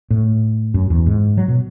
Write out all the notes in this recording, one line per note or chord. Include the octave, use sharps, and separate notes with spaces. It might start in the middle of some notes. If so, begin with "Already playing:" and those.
A2
F#2
E2
G#2
F#3
B2